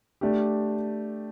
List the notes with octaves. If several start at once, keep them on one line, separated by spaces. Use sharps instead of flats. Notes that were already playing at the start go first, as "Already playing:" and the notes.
A3 D4 G4